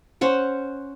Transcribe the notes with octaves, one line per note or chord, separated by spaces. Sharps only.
C#4 C5 F#5